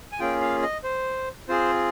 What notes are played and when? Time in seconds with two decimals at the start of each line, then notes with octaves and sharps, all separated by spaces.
0.12 G#5
0.19 A#3 C#4 F4 G#4 G5
0.41 F5
0.63 D#5
0.84 C5
1.48 C4 F4 G#4 C5